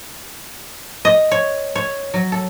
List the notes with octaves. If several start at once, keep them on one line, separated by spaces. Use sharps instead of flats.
D#5
C#5
C#5
F#3
A4